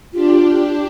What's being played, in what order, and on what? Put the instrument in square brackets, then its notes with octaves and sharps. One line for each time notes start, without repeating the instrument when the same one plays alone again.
[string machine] D4 G4 [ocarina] F4